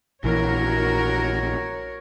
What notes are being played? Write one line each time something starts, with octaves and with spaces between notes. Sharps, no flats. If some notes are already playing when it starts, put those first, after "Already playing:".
A#1 E3 F#4 A#4 C#5